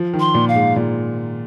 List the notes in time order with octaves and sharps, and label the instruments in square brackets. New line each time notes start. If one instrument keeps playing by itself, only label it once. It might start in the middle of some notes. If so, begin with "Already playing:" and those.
Already playing: [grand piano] F3
D#3
[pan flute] C6
[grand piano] A#2
[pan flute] F5
[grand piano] G#2
A#2